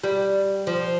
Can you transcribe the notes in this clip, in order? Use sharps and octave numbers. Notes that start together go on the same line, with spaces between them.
G3
F3